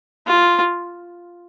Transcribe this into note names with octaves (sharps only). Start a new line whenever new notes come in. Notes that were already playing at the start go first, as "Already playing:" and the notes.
F4